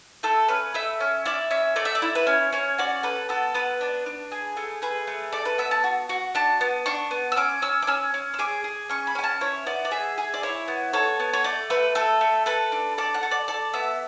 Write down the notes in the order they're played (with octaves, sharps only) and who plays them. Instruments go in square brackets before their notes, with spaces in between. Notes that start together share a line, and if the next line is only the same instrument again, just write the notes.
[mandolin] A3 A4
C#4 B4
A3 E5
C#4
E4 D5
C#4 E5
A3 D5
E5
D5
E4
B4
C#4 C#5
C#4 C#5
F#4 D5
A4 B4
B3 A4
B3 B4
D4
D4
G#4
A3
G#4 B4
A3
A4 D5
B4
B3 E5
A5
F#4
F#4
D4 A5
B3
D4 C#6
B3
E6
C#4 D6
C#4 E6
D6
C#4 E6
C#4
E6
G#4 D6
G#4
C#4 C#6
B5
C#4 G#5
A5
E4 C#5
B3 D5
D5
G#4 E5
G#4
D5
E4 C#5
B3
A4 C#5
B3
C#5
A3 D5
A3 B4
A3 A4
A3
A4 B4
D4
A4 D5
F#5
A4
D5
A4 D5
B3 E5